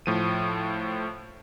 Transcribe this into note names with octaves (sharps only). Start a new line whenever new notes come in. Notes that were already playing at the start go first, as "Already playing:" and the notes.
A2 F3 D#7